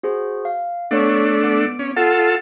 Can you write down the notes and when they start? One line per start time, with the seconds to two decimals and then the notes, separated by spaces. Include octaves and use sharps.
0.03 F#4 G#4 C5
0.45 F5
0.91 A3 B3 D4 C#5 C#6
1.43 B3 D6 D7
1.79 C#4
1.96 F4 A4 F#5 A5